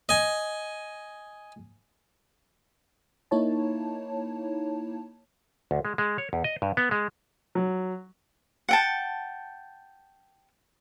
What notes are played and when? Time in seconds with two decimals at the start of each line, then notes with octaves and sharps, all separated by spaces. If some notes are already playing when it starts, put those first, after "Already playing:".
0.09 D#5 G#5
3.31 A#3 D#4 E4 C#5 A5
5.71 D2
5.85 G#3
5.98 G#3
6.18 C#5
6.33 E2
6.44 D#5
6.62 G2
6.77 B3
6.91 G#3
7.55 F#3
8.69 F#5 G5 A5